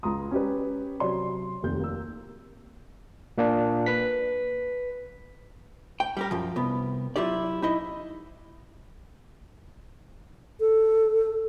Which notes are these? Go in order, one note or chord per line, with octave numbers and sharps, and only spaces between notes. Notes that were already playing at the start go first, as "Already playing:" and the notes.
C#2 A#5 C6 D#6
C#4 G4 B4
C3 F#3 C#5 C6
F1 D#2 G6
A#3 E6
A#2 A#3 D4
B4 B6
G5
G3 G4 A#4
F#2 F3
C2 B3
F#3 E4 F4 G4 D5
D#4 E4 D#5
A4